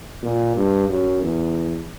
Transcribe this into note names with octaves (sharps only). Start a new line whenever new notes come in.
A#2
G2
F#2
E2